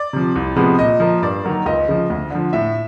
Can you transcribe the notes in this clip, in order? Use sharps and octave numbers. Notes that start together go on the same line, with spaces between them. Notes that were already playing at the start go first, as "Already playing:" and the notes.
Already playing: D5
C3 F3
C2
C3 F3 G#3 B3
A#2 D#5
F3 A#3
G2 D5
D#3 F#3 A#3
C#2 D#5
C#3 F3
D2
D3 F3
A2 E5